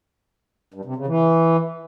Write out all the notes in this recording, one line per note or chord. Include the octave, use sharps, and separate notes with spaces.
G2
C3
C#3
E3